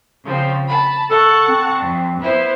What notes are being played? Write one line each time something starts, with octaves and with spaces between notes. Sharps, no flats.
C#3 F3 C4
A5 B5
A4 F#5 A5 C#6
C4
F2
B3 E4 C5